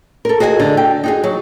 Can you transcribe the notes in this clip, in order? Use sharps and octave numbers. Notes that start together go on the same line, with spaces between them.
A4 A#4
F#4 G#4 D#5 F#5 G#5
D3
G5
D#4 F#4 G#4
F#3